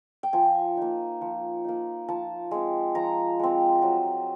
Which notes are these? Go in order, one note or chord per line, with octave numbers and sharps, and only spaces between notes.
G5
F3 G#5
A#3 D#4
F3
A#3 D#4
F3 A5
G#3 C4
F3 A#5
G#3 C4
F#3